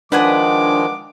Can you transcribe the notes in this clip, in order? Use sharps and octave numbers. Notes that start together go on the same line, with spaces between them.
D#3 F3 G#3 D4 B4 F#5 G#5 D6